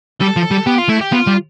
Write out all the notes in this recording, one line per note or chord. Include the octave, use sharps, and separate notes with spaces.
G3 A4
F3
G3
B3 G4
F4
A3 E4
G4
B3 F4
G3